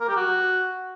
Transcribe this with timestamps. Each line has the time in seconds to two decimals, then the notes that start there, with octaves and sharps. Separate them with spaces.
0.01 A#4
0.09 G4
0.16 F#4